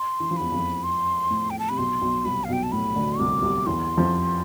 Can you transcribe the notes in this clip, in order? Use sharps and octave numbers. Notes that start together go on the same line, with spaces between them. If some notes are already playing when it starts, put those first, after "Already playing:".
Already playing: C6
E3
F3
E2 E3 B5
F2 F3
C6
A2
G5
A5
C3 B5
B1 B2 C6
B1 B2
C2 C3 B5
B1 B2 F5
G5
A5
A2 B5
D2 D3
C2 C3 D6
C2 C3
E2 E3 C6
F2 F3